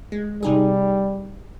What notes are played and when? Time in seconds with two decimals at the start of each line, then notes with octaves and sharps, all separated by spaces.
0.12 G#3
0.43 C3 G3 D#4 G#4